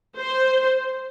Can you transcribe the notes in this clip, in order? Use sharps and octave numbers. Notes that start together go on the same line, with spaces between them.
C5